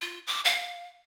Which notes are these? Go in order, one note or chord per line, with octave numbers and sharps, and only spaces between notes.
F4
D6
F5